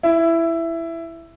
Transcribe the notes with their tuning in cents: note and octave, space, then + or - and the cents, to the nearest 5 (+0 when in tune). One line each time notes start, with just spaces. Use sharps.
E4 +10